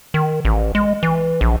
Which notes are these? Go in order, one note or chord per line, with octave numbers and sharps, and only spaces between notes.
D#3
A1
G#3
E3
A#1